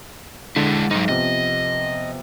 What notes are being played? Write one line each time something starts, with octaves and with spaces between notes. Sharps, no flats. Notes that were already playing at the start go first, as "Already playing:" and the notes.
D3 G#3 E4 A6
G#2 F#3 D#4
C3 F3 B3 D#5